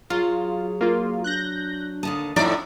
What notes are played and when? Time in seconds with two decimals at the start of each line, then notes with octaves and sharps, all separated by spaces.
0.10 F#3 F4 G#4
0.81 A#3 F4
1.24 D4 F#6 G6 A#6
2.03 D#2 D3 A5 D#6
2.36 F2 A2 D#4 E4 D5